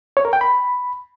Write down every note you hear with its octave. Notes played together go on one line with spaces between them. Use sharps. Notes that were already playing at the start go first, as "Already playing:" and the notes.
C#5
A#4
G5
B5